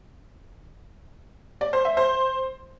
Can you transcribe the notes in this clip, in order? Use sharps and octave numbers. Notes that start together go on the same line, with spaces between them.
D5
C5
E5
C5